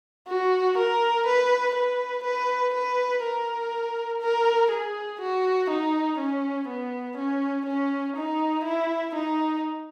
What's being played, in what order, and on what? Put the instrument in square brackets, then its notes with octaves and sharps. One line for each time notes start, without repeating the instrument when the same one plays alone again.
[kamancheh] F#4
A#4
B4
B4
B4
B4
A#4
A#4
G#4
F#4
D#4
C#4
B3
C#4
C#4
D#4
E4
D#4